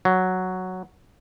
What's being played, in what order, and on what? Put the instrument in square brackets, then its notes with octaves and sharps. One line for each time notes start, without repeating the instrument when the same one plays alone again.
[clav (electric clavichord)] F#3